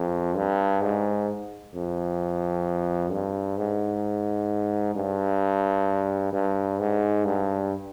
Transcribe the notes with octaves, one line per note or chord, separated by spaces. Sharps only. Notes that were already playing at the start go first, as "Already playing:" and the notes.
Already playing: F2
G2
G#2
F2
G2
G#2
G2
G2
G#2
G2